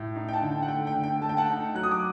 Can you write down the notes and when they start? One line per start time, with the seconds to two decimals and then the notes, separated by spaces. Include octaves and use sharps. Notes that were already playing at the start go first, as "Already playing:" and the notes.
Already playing: A2
0.16 D#4
0.29 G5
0.33 F#5 A5
0.42 D3
0.51 G5
0.62 F#5
0.68 A3 G5
0.87 G5
0.95 D3
1.04 G5
1.21 A3 A5
1.29 G5
1.37 F#5 A5
1.49 D#4
1.75 F#3 F#6
1.83 D#6
1.91 D6